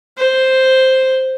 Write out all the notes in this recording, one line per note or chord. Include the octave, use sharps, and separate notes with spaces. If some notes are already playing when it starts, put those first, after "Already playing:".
C5